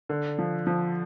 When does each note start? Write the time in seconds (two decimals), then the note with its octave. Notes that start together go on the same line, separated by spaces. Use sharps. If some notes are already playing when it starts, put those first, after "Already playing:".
0.09 D3
0.39 F3
0.67 F3